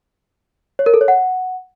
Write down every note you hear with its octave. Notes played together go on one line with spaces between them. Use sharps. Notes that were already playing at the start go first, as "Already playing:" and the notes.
C#5
A#4
A4
C#5
F#5